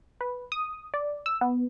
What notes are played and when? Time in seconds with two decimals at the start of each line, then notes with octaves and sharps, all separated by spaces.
0.21 B4
0.52 D#6
0.94 D5
1.26 E6
1.41 B3